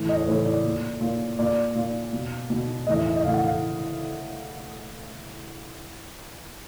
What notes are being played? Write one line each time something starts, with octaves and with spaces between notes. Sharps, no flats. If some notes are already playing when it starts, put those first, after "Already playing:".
Already playing: A2 E3
D#5
C#5
A2 E3 C5
D5
A#2
A#2
A#2 D5
A#2
B2
B2
A2 E3 D#5
E5
E5
D#5
A2 E3 F5
F#5
F5